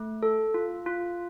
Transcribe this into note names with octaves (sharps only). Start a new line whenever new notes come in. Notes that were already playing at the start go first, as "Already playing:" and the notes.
Already playing: A3
A4
F4
F4